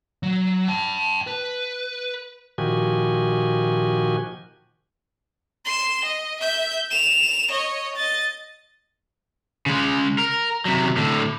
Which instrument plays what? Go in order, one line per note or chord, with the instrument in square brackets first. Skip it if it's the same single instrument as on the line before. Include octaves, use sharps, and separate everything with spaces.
[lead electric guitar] F#3
G5 A5
B4
[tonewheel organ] A#2 D#3 F3 F#4 G4 G#5
[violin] C6 E7
D#5
E5 G6
E7 F7
C#5 D#5
D#5 A6
[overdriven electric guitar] C#3 G#3
A#4
C3 F#3
A2 D3